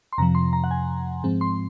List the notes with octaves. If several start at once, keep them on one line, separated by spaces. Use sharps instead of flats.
C6
F2 C3 F3 A#5
C6
A#5
F#5
G#5
G#2 F3 G#3 C4
C6